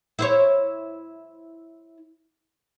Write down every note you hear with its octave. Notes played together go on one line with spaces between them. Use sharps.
E4 C5 C#5